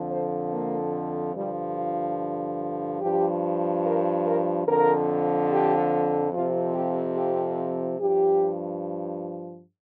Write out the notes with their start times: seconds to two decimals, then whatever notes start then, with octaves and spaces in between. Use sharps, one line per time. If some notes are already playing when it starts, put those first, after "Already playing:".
Already playing: F2 D3 F3
0.09 C5
0.51 A#3
1.35 G2 D3 F3 G3
1.76 F4
3.01 G2 F3 G4
3.84 A#4
4.25 A#4
4.67 F2 D3 F3 A#4
5.50 G4
6.33 F2 C3 F3 F4
6.75 G4
7.16 G4
8.00 G2 F3 G4